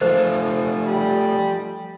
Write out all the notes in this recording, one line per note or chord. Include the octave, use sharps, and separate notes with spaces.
F3 A3 F4 C5
G3